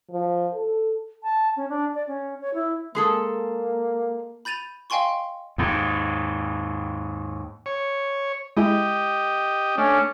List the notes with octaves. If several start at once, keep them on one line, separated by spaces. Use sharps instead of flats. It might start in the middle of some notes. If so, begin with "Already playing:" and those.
F3
A4
A5
C#4
D4
D5
C#4
C#5
E4
G#3 A#3 G#4 A4
B5 G6 A6 D#7 F7
D#5 F5 G5 G#5 C6 C#6
D#2 G#2
C#5
G#3 E4 G4 D#5
A3 C#4 D4